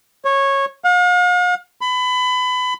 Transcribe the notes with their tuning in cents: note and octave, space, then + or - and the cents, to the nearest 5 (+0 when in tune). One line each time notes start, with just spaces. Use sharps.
C#5 -15
F5 +45
B5 +25